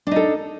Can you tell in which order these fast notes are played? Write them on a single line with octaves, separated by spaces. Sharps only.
D4 D#4 A4